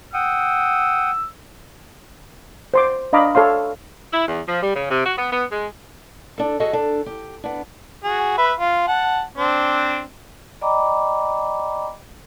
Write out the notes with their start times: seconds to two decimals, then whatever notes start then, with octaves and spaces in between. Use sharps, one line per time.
0.14 F#5 G5 D#6 E6
2.74 C5 C6 D6
3.13 D4 D#5 F5 A#5 B5 D6
3.35 A4 C#5 F5 C6
4.13 E4
4.28 E2
4.48 F3
4.62 G3
4.76 C#3
4.90 C3
5.06 F#4
5.17 B3
5.32 B3
5.52 G#3
6.38 D4 A4
6.60 F#4 G#4 A4 D#5 F#5
6.73 D4 A4
7.06 G4
7.44 B3 D4
8.04 F#4 G#4
8.38 B4 E5
8.60 F4
8.88 F#5 A5
9.38 C4 D4 C5
10.61 D5 D#5 G5 A#5 B5 D6